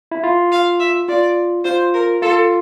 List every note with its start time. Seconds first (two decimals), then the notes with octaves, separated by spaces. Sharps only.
0.11 E4
0.24 F4
0.52 F5
0.80 E5
1.09 F4 D5
1.65 F4 C5
1.94 A#4
2.22 F4 A4